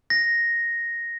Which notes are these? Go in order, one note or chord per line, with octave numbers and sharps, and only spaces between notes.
A#6